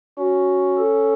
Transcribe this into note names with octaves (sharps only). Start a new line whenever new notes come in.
C#4 F#4
A4